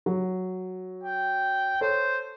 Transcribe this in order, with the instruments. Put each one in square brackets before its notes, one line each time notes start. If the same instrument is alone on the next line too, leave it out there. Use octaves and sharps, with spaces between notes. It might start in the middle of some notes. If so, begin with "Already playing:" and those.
[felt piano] F#3
[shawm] G5
[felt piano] A4 C#5 [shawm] C5